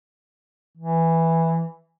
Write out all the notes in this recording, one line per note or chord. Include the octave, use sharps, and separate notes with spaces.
E3